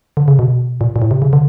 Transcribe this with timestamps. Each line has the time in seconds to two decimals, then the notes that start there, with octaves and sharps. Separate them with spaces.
0.17 D3
0.28 C#3
0.39 B2
0.81 A#2
0.96 A#2
1.02 A2
1.11 C3
1.22 C#3
1.33 D3